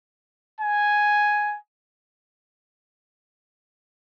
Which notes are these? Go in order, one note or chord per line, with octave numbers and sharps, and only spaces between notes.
G#5